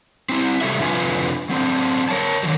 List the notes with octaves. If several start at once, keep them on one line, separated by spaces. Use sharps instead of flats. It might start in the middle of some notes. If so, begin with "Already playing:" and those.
C4 E4
C3 G3 A3 F#4 E5
F2 C3 D4 F4 B4 G#5
F#3 C4 D4
A#4 C#5 A5
D3 D#3 F#3